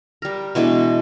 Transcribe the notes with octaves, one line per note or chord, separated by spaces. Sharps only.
G3 A#4
B2 E3 G#3 D4